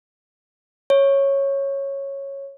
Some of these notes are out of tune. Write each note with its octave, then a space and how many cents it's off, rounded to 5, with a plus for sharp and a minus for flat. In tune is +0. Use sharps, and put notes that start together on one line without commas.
C#5 -10